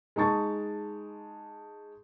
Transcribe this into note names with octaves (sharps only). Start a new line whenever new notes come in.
G#3 D#4 A5 C#6 A6